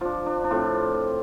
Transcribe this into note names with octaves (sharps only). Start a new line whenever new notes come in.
F3 D4 F4
D4
D4
A2 F3 C4 F4